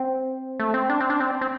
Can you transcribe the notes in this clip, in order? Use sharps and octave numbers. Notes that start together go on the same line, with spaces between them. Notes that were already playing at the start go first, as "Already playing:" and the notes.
Already playing: C4
A3
C4
D4
C4
D4
C4
C4